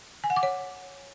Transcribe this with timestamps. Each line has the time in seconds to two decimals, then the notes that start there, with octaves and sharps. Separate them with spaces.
0.24 G#5
0.30 F#5
0.36 D6
0.43 C#5